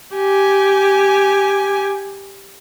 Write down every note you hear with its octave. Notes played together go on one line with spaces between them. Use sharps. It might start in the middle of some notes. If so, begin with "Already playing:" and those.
G4 G#5